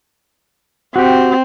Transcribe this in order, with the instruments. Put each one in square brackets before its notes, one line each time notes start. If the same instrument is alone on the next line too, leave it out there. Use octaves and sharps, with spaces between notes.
[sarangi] C4 [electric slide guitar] F#4 G4